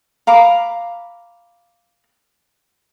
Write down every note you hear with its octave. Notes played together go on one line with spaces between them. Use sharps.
F5 A#5 B5 D6